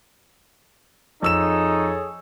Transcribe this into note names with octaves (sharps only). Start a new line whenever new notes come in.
F2 D#4 G#4 A4 C#5 E6 E7